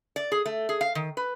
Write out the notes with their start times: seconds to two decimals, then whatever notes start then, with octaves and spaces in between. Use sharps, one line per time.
0.16 D5
0.32 G#4
0.46 A3
0.69 G#4
0.81 F5
0.95 D#3
1.17 B4